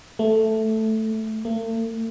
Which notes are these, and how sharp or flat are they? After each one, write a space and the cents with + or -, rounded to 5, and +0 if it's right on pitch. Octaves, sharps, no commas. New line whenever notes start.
A3 +0
A3 +45